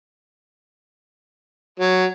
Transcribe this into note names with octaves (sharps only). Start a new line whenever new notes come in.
F#3